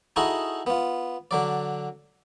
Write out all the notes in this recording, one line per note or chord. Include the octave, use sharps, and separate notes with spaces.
D#4 E4 F#4 G#4 A4 D#5
B3 F4
D3 F#3 D5